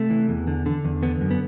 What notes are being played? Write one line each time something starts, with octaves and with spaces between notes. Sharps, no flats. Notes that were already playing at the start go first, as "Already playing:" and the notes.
Already playing: C3 A3
E3
E2
D3
D3
E2
D3 B3
F#2
B3